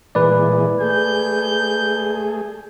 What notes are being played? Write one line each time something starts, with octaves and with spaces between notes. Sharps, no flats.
A#2 E3 G#3 B4 D5
A3 G#4 G6